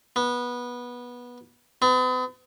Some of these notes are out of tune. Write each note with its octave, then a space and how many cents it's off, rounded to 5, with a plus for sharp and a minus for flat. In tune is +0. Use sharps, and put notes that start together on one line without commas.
B3 -15
B3 +45